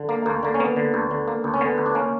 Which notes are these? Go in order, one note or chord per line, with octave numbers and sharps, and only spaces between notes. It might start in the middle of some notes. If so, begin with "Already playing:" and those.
Already playing: D3
A#3
D2 A#3
D3 A#3
C#4
A#3 B3
D3
D2
D3
A#3
D2
C#4
D3 B3
D2
D4
A#3 C#4